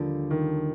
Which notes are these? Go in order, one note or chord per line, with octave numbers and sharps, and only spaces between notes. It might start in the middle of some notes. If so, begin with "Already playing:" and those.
Already playing: D#2 D3 F3 G3 A#3 D4
D#3